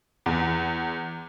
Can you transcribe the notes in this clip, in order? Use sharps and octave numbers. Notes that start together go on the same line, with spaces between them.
E2